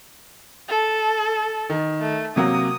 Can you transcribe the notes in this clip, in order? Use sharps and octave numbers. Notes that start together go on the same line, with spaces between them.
A4
D#3
A3
C3 F#3 A#3 D#6